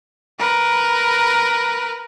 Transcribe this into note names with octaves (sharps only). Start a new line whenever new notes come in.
A#4 B4